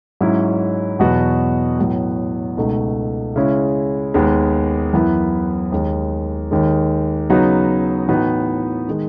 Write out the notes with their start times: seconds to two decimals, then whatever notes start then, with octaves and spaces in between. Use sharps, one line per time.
0.21 G#2 F#3 C#4 E4
0.99 E2 B2 F#3 B3 F#4
1.79 A2 F#3 B3
2.57 C#2 B2 A3 D#4
3.36 C#3 G#3 C#4 E4
4.14 D#2 D#3 G#3 B3
4.94 F#2 E3 B3 E4
5.72 D#2 D#3 G#3
6.51 D#2 D#3 G#3
7.29 C#3 F#3 B3 D#4 F#4
8.08 A2 E3 B3 D#4 F#4
8.89 D#3 G#3